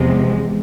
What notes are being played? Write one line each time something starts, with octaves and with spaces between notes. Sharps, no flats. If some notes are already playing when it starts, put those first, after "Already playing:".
Already playing: E2 C3 F3 G#3